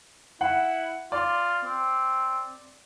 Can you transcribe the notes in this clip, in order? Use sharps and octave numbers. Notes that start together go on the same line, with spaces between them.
E4 F#5
F4 D5
C4